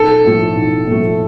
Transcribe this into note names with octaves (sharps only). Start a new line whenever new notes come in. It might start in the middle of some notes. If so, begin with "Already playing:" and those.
Already playing: B1 A4
A2 F3 A3
B1
A2 F3 A3